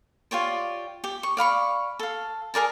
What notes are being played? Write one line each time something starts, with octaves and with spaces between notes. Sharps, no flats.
F4 G4 C#5 D5
G4
C#6
D5 F5 B5 C#6
A4 F5
G#4 A#4 D5 A5